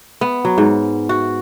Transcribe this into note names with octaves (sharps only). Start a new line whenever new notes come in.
B3
F#3
G#2
F#4